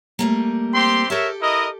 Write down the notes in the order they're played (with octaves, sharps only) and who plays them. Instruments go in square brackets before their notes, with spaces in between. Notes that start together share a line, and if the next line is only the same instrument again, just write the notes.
[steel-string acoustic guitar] G3 A3 A#3
[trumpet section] C4 G4 C6
[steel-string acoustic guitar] G4 A4 [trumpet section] A#4 C#5 E5
[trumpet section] E4 A#4 D#5